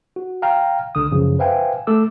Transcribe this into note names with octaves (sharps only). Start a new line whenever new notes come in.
F#4
F5 G5 A#5 F6
C2 D3 D#6
F#2 C#3 F3
B4 C5 E5 F5 G5 G#5
A3 A4 D6 E6